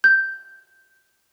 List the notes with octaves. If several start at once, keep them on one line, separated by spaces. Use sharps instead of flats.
G6